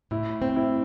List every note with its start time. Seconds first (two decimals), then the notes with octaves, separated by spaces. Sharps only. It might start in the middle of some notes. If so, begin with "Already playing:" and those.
0.11 A2 E4
0.42 C4
0.56 E4